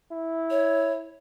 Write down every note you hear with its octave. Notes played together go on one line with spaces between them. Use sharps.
E4
C#5